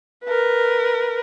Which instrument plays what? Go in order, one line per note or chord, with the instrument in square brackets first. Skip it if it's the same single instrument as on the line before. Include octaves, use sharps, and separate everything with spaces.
[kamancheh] A#4 B4